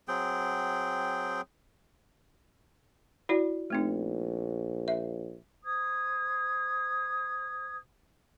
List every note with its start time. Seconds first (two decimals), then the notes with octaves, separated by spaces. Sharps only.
0.08 F#3 C4 G#4 G5
3.29 E4 F#4 D5
3.70 A#1 A3 C4 D#4
4.88 E5
5.64 C5 D#6 G#6